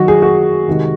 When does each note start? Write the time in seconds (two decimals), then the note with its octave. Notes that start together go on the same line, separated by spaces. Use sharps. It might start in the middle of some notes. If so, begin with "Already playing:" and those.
Already playing: F#2 D#3 F#3 F#4
0.08 G#4
0.22 F#4
0.68 C3 D#3 G#3